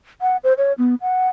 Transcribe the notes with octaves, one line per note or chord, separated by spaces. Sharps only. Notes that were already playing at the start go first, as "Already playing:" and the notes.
F#5
C5
C#5
B3
F#5